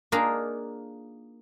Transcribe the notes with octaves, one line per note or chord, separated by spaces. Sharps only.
A#3 D4 D#4 F4 G#4 A#4